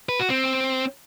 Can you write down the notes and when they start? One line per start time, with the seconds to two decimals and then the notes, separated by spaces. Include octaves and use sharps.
0.09 B4
0.19 F#4
0.30 C4